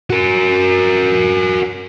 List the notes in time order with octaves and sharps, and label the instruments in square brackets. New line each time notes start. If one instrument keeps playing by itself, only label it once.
[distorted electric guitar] F#4 A#4